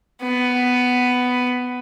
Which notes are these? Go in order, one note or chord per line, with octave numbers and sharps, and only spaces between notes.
B3